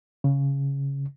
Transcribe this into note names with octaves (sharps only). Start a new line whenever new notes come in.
C#3